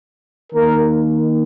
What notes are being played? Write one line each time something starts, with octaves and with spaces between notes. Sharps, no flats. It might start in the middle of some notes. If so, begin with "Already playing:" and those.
D#3 A#3 A#4